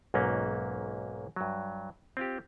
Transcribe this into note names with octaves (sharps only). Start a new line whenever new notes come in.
B1 G#2 F#3 A#3 C#4
G2 F#3
C4 F4 G4